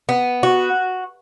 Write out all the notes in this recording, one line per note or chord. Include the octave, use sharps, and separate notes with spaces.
B3
F#4